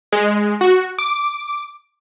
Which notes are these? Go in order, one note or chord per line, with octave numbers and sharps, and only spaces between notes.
G#3
F#4
D6